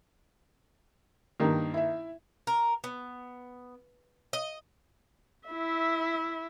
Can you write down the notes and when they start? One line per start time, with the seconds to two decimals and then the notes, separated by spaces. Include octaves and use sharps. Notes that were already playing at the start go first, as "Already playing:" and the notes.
1.40 G2 D#3 A#3 G4
1.74 E4 E5
2.47 A#4
2.84 B3
4.33 D#5
5.48 E4 E5